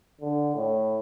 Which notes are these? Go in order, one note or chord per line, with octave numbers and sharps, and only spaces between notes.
D3
A2